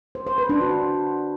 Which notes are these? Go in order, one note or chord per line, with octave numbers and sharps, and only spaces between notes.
C5
C5
B4
D4
F#4